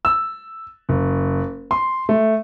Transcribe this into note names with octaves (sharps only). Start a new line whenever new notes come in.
E6
F#1
C6
A3